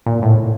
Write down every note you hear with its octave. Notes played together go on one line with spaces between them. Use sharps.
A#2
A2